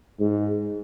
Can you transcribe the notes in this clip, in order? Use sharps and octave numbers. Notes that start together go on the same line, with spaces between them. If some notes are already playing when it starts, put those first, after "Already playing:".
G#2